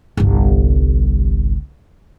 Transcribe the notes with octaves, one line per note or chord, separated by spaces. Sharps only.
G1 C2